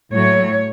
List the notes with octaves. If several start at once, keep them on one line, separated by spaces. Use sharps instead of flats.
A2 F#3 A3 C#5